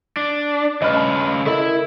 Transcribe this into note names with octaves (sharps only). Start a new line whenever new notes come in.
D4
C#3 B4 D#5 F6
A5
E4 A4 A#4 D#5